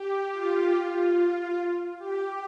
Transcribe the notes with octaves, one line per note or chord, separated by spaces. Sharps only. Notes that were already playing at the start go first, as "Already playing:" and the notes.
Already playing: G4
F4
G4